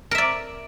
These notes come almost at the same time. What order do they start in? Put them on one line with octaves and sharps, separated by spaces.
A#4 E5 D5